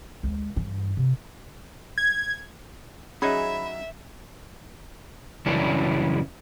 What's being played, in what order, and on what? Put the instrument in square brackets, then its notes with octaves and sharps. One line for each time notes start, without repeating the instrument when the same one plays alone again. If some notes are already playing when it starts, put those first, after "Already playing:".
[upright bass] D2 G#3
G2 E3
C3
[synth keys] G#6
[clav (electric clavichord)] F#3 D#4 F#5 [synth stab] C#4 G#4 G#6 [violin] E5 [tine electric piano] B5
[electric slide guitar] F#2 C#3 E3 G3 C#4 D4